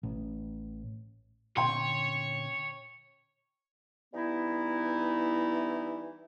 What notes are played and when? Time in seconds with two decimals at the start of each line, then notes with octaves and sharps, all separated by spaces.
0.03 A1
1.57 A#2 D3 C#4 C#5 G5 C6
4.14 E3 G3 B3 D#4 E4